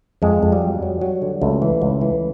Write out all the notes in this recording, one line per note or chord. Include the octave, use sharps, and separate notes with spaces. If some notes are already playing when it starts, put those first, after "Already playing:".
F2 G#3
F2
G3
F#3
F#3
F#3
D3
C#2 A3
E3
C#2
E3